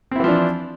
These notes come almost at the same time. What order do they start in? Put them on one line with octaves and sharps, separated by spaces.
C4 E4 E3 F3 D4